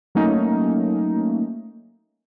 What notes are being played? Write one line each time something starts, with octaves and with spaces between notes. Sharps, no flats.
F#3 A3 A#3 C#4 D#4